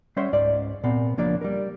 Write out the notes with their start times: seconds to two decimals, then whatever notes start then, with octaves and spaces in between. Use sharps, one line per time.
0.16 G3 C#4 C5 E5 F#5 C6
0.33 C#2 G#2 C#3 D5
0.83 A#2 B3 C4
1.17 C#2 F3 A#3 D4 D5
1.42 G3 A#4